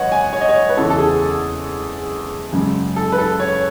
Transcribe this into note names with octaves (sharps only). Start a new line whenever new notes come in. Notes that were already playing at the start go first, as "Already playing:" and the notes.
Already playing: G#1 F#2 B4 C#5 D#5 F#5
G#5
C#5
D#5
C#5
B4
E2 C#3 E3 A4
A4
G#4
A4
F#2 C#3 G#3
A4
B4
A4
C#5